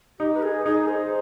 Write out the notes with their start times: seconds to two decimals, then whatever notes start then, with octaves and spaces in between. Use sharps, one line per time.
0.20 D#4 G4
0.34 B4
0.43 G#4
0.65 D#4 G#4
0.88 C5